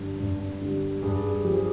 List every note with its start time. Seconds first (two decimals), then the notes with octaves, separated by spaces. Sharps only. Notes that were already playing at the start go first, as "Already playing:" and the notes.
Already playing: G2 D3 G3
0.20 G2
0.61 D3 G3
1.03 G2 G#4
1.44 F3 G4
1.54 G#4